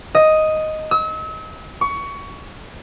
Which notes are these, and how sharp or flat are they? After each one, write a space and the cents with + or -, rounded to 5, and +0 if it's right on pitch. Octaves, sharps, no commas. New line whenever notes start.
D#5 +5
E6 -40
C#6 +20